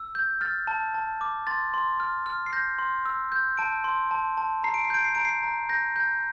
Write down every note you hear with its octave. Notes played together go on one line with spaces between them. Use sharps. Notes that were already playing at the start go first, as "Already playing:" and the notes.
Already playing: E6
G6
F6 A6
A5
A5
D6
C6 A6
C6
F6
F6
C7
G6 A#6
C6
E6
G6
A5 D7
C6
A5
A5
A#5 C7
D7
C7
G6 D7
C7
A#5 D7
C7
A#5
G6 A#6
G6